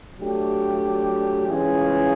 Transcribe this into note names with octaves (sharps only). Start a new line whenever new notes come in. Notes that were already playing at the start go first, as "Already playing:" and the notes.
F#3 A3 D4 G4
E3 G#3 C#4 F4 G#4